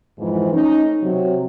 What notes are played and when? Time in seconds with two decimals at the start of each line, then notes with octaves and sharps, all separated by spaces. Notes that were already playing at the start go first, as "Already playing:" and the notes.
0.18 F2 G#2 E3 F3
0.53 A3 C#4 D#4
1.02 C3 F#3